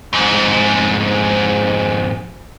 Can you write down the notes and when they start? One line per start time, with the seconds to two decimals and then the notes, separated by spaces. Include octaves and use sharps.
0.13 F2 G#2